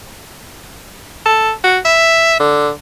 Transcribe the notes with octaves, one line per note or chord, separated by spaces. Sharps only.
A4
F#4
E5
D3